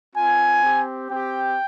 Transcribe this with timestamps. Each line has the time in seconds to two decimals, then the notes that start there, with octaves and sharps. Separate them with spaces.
0.15 C4 F4 G#5
0.62 C4 G4
1.10 C4 G4 G5